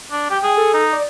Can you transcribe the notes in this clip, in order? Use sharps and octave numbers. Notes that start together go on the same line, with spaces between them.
D4
G4 G5
G#4
A4
D#4
D5